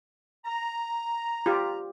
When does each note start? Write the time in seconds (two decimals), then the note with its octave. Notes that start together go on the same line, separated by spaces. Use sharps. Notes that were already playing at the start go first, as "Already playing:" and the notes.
0.45 A#5
1.46 F4 G4